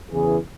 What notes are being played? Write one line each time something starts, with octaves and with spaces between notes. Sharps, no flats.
E2 C#3 E3 G#4